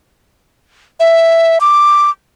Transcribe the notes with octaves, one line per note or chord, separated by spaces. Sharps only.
E5
D6